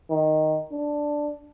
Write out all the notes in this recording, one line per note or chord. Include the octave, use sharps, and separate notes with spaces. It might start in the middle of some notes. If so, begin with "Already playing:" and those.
D#3
D4